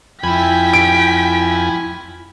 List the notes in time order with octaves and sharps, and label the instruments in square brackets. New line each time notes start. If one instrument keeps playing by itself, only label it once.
[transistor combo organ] F2 G#5 [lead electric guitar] E4 B5 [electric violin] G5 B6
[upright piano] D7